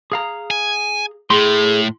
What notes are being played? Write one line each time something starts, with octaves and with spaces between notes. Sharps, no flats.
G#4 F5 A#5
G#5
A2 G#4 C6